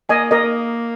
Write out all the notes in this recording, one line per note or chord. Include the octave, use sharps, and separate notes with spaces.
A#3 D#5 G#5
A#3 A#4 D#5